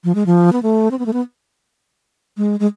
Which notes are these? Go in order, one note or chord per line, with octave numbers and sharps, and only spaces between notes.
F3
G#3
F3
B3
A3
C4
B3
A3
B3
G#3
G#3